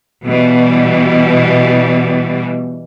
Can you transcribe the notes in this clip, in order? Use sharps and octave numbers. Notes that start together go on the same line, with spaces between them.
B2 E3 G3